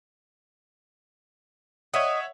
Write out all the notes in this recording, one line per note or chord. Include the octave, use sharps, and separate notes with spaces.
C#5 D#5 E5 F#5